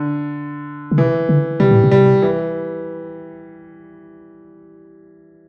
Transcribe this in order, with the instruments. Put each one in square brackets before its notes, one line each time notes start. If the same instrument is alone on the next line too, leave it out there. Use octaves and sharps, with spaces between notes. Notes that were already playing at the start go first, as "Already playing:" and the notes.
Already playing: [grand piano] D3
[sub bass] D3
[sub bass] C3 [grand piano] E3
[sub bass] D3
[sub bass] C3 [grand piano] G3
[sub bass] A2
C3
[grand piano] G3
E3